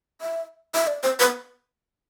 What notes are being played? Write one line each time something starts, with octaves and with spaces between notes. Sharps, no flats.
E5
E5
D5
C5
B4